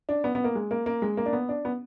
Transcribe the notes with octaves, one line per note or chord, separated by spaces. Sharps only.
D4
B3
B3
A#3
G#3
A#3
A#3
G#3
A#3
D4
B3
D4
B3